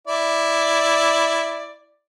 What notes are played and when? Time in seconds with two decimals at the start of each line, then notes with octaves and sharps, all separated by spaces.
0.07 E4 D5